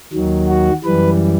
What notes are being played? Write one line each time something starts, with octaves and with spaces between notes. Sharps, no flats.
D#2 D#3 F#3
F#4
F#2 E3 G3 B4